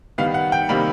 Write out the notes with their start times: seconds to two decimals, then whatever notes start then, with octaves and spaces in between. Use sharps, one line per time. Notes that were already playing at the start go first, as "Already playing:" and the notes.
0.18 D#3 G3 B3 F5
0.34 F#5
0.52 G5
0.69 C3 D#3 G3 A#3 B5